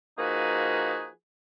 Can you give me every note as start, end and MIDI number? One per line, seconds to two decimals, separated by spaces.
0.18 1.08 53
0.18 1.08 58
0.18 1.08 63
0.18 1.08 66
0.18 1.08 68
0.18 1.08 71